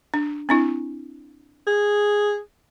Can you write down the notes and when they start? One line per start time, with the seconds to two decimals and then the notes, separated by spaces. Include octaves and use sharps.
0.14 D4
0.49 C4 D4 E4
1.67 G#4